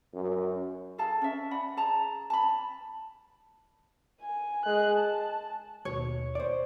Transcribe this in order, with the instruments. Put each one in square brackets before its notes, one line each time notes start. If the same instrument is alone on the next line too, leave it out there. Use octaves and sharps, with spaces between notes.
[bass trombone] F#2
[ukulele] G#4 A4 F5 A5
C#4 E5
D5 F#5 B5
G#4 A5 A#5
A5 B5
[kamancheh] G#5
G#3 F#6
A5
[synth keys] D#2 B2 [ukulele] C#5
[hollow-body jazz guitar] C5 D5